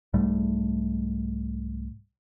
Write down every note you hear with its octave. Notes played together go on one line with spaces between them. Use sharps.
C2 G#2 G3 A3